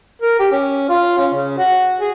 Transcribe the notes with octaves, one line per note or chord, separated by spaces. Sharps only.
A#4
G4
C#4
F4
C#4
C#3
F#4
G#4